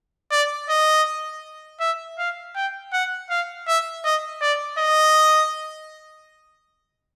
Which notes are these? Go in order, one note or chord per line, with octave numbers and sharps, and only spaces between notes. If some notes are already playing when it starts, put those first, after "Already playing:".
D5
D#5
E5
F5
G5
F#5
F5
E5
D#5
D5
D#5